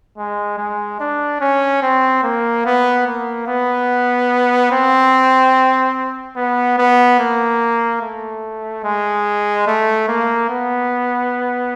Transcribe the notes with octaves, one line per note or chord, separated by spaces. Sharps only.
G#3
G#3
D4
C#4
C4
A#3
B3
A#3
B3
C4
B3
B3
A#3
A3
G#3
A3
A#3
B3